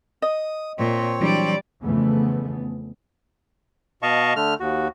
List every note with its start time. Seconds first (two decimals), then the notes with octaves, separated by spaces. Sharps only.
0.22 D#5 D#6
0.78 A#2 C4 C#5
1.21 E3 F#3 G3 D4 D5
1.83 F2 C#3 E3 A3 B3
4.02 B2 D#5 F5 A5 C#6
4.36 D3 A3 F6
4.60 D#2 F#4